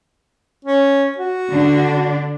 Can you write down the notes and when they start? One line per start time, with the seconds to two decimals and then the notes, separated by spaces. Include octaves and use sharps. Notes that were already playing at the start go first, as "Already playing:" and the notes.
0.65 C#4
1.18 F#4
1.49 D3 D4